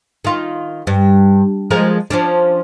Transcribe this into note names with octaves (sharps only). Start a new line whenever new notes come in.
D#3 F4
G2
F3 G#3 A#4
F3 C#4 D4